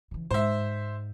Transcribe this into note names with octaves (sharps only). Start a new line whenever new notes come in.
C#3 E3
G#2 C5 E5